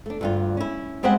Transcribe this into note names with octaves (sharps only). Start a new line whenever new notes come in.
A3 D4
D2 G2 F4
C#4 E4
G3 G#3 C4 C5 E5 F#5